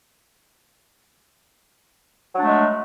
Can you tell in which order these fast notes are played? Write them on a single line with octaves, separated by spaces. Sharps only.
F#3 D4 A3 G#3